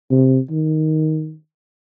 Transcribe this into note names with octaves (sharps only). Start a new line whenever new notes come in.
C3
D#3